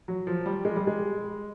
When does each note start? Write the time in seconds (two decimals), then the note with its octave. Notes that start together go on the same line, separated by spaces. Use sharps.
0.08 F#3
0.27 F3
0.46 G3
0.65 G#3
0.76 G3
0.87 G#3